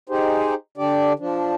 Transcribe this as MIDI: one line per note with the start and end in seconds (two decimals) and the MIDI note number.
0.09 0.54 63
0.09 0.54 67
0.09 0.54 68
0.09 0.54 72
0.78 1.13 50
0.78 1.13 62
0.78 1.13 67
0.78 1.13 74
1.19 1.55 53
1.19 1.55 62